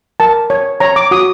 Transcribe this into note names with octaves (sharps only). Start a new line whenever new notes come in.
A#4 A5
C#5
C#5 A#5
D6
F#4 D#6